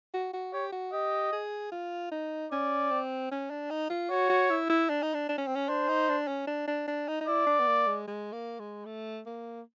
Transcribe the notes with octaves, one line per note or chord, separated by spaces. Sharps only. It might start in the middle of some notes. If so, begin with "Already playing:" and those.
F#4
F#4
G4 C#5
F#4
G4 D#5
G#4
F4
D#4
C#4 D5
C4
C#4
D4
D#4
F4
F#4 C#5
F#4
E4
E4
D4
D#4
D4
D4
C#4
C4
C#4
D4 C5
D#4
D4
C#4
D4
D4
D4
D#4
D#4
E4 D5
D4
B3
A#3
G#3
G#3
A#3
G#3
A3
A#3